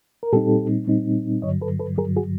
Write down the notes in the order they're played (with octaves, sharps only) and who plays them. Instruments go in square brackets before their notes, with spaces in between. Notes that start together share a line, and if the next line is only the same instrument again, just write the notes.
[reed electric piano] A#4
A#2 G3 C4 D#4 G4 A4
A#2 G3 C4 D#4
G2 D3 F#3 C#5 D#5
A4 B4
A4 B4
G2 D3 F#3 G#4 A#4
F#4 G#4